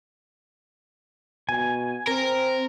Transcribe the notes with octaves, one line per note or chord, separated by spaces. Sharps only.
B2 G#5
C4 A#4